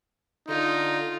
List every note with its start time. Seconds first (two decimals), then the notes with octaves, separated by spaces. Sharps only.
0.48 D3 D#4 F4